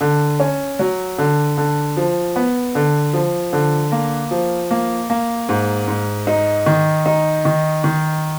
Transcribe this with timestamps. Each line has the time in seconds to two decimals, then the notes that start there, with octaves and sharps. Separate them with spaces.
0.01 D3
0.40 C#4
0.79 F#3
1.18 D3
1.58 D3
1.97 F3
2.36 B3
2.75 D3
3.13 F3
3.53 D3
3.92 A#3
4.31 F3
4.71 A#3
5.10 A#3
5.49 G#2
5.88 G#2
6.27 D#4
6.66 D#3
7.06 D#4
7.45 D#3
7.84 D#3